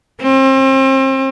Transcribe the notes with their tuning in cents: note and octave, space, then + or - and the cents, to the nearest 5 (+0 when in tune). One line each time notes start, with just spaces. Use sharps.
C4 +35